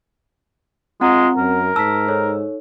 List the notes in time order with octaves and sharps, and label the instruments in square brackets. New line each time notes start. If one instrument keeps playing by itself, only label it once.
[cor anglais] G#3 [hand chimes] C4 [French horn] F4 [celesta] F#5 A#5
[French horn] F#2 [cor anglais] A#4
[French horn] G#2 [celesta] A5 B6 [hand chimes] E6
[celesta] D#4 A4 C#5